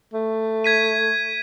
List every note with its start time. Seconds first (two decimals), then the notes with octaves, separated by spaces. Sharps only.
0.14 A3
0.64 G#6 B6 D#7